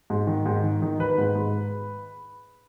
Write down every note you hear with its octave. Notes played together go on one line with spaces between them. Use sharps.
G#2
D#3
G#2
D#3
D#3
D#3 B4
G#2
G#2